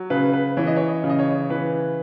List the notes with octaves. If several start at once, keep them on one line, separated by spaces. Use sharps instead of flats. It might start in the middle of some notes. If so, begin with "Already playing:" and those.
Already playing: F#3
C#3 B4
B4
E3 C#5
D#5
C#5
D#5
C#3
D#5
C#5
E3 B4